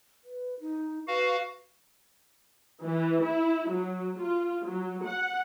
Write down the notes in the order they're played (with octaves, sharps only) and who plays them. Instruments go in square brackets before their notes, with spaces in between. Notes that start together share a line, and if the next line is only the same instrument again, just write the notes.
[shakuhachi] B4
D#4
[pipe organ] F#4 F5 [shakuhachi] B4
[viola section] E3
E4
F#3
F4
F#3
F#5